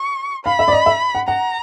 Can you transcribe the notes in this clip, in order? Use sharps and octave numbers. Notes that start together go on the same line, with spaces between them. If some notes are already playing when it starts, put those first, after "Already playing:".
Already playing: C#6
F5 B5
E5
D5
D#5
E5
F#5
F#5 A#5